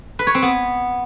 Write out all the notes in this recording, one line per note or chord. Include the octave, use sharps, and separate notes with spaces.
B4
C#5
C4
B3